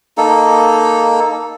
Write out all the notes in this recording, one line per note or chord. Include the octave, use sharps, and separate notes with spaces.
A#3 D#4 A4